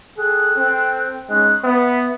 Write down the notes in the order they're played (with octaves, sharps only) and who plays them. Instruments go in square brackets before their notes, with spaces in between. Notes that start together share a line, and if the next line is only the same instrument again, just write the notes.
[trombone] G#4 [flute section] A4 G5 F#6
[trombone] C4
[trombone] G#3 [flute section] C#4 D#4 F#6
[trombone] B3 [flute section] E5